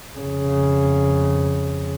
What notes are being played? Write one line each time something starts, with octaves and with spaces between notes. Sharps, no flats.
F2 C#3